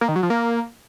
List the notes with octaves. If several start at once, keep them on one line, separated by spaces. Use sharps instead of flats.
A#3
D#3
F#3
F3
A#3